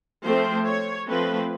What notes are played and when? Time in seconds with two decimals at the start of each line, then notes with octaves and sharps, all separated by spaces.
0.25 F3 A3 C4 C5
0.67 C#5
1.07 F3 A3 C4 B4